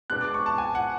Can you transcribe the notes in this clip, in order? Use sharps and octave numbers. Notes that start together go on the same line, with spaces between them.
B2 G#3 B3 D4 F#6
D6
C#6
A5
G#5
F#5